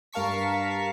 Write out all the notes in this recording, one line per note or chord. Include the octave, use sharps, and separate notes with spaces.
G2 A#4 F5 A5 C#6 B6